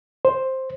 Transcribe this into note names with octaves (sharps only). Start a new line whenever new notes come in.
C5